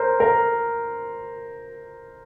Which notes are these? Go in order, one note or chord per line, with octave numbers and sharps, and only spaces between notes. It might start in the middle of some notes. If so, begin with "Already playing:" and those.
Already playing: A#4 C5
A#4